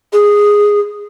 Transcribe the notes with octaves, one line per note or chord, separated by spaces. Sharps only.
G#4